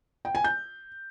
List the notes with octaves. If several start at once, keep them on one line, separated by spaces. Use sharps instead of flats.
G5
G#5
G6